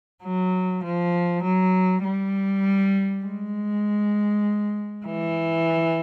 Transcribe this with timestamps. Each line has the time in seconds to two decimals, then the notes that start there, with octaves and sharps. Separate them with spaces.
0.23 F#3
0.83 F3
1.43 F#3
2.04 G3
3.24 G#3
5.06 E3